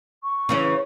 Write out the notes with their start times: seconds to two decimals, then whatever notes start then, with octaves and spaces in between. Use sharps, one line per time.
0.23 C#6
0.49 C#3 E3 C#4